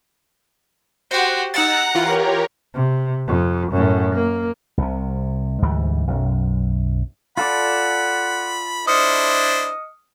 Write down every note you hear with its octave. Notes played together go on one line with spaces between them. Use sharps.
F#4 G4 C5 F#5
D#4 F#5 A#5 E6 F#6 A6
E3 F4 G4 A#4 C#5
C3
F2
F#2 A2
A#3
C2 C3
D2 G#2 E3 G3
B1 F#2
F4 A4 D5 F#5 B5
D4 E4 C5 D#5 D#6 F6 C#7